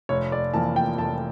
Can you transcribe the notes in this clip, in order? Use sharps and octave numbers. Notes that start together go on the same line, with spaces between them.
F1 C#5
D5
F2 E3 A#3 A5
G5
F1 A5